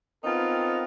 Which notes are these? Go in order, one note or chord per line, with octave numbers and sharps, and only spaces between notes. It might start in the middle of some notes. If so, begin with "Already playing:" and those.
B3 C4 D#4 F4 A4 A#4